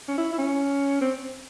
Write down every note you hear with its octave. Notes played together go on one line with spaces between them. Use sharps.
C#4
E4
E4
C#4
C4